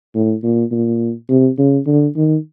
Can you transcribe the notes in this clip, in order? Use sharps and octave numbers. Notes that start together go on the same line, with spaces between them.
A2
A#2
A#2
C3
C#3
D3
D#3